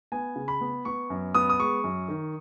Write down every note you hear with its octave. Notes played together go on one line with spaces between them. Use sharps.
B3 G#5
C#3
B5
B3
B3 C#6
F#2
B3 D#6
D#6
G#3 C#6
F#2
D#3